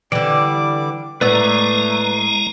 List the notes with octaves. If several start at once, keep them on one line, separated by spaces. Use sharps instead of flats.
D3 E3 G3 D5 D6
A2 G#3 A3 B3 B4 D5 A#5 E6